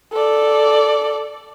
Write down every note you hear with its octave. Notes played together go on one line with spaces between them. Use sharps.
A4 D5